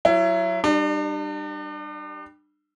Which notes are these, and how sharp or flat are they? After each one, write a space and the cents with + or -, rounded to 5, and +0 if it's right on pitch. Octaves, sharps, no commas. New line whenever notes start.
F#3 +0 E4 +30
G3 +0 D4 +40